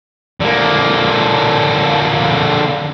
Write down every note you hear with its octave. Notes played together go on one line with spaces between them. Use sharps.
D3 A#3